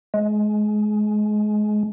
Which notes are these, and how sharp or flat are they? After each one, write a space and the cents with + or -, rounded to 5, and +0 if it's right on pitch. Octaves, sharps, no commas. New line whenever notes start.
G#3 +25